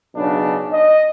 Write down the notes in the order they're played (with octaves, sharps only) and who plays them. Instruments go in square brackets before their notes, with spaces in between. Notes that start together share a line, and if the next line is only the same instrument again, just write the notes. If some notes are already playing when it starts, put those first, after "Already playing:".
[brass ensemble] B1 C#3 D4
D#5